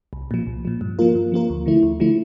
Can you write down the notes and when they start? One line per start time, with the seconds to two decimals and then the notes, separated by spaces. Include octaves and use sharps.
0.13 C2
0.31 A#2 F3
0.47 C2
0.65 A#2 F3
0.81 G2
0.99 F3 A#3 F4 A#4
1.15 G2
1.32 F3 A#3 F4 A#4
1.50 D2
1.66 D3 F3 A3 E4
1.83 D2
2.00 D3 F3 A3 E4